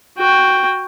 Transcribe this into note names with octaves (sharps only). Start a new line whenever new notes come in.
F#4 G5